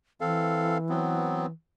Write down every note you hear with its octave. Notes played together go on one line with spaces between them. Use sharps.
E3 C4 A4 F5
F#3 B3 C4